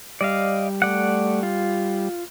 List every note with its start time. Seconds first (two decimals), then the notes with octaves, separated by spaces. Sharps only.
0.21 G3 D5 D#5 F5
0.82 A3 D5 F#5
1.43 F4